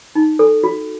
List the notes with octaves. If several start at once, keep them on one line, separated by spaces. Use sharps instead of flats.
D#4
A4
F#4